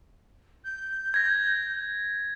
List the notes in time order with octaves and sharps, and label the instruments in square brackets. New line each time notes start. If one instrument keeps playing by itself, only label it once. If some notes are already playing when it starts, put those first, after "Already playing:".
[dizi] G6
[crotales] G#6 A#6